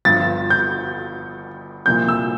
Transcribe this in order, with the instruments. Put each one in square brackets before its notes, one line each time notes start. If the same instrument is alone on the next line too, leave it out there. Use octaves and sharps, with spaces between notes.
[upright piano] G1 G2 F3 A6
G6
C2 A#2 F3 G6
E6